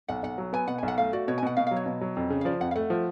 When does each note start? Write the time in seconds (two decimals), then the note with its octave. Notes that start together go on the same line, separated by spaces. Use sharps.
0.08 B1 F#5
0.23 B1 F#5
0.38 F#3
0.53 B3 G#5
0.67 B2 F#5
0.78 G#5
0.83 B1
0.88 F#5
0.98 A3 F5
1.13 F#4 D5
1.28 B2 C#5
1.38 G#5
1.43 B2 F#5
1.57 B2 F5
1.67 F5
1.71 F#3
1.76 C#5
1.86 B2
2.01 F#3
2.16 F2
2.30 C#3
2.41 F5
2.45 F3 D5
2.60 F2 F#5
2.71 F5
2.76 A3 F#5
2.90 F3